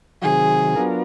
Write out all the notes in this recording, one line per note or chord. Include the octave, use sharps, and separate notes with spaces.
C3 D#3 F#3 G#4
F#3 B3 D4 F4 A#4